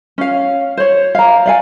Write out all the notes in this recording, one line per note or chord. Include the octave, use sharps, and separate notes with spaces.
C#4 F5
C5 C#5
F5 A#5
D5 F5 G#5